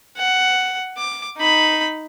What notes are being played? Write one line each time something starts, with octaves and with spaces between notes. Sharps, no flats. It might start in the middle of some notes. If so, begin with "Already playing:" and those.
F#5
D6
D#4 B5